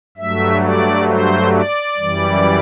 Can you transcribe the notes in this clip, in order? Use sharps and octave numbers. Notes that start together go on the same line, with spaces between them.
G2 F#3 A3 E5
D5
C5
D5
F#2 E3 G3